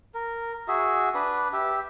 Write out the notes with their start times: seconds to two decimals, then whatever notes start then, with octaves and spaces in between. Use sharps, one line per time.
0.14 A#4
0.68 F#4 G#4 E5
1.15 D4 B4
1.53 G4 E5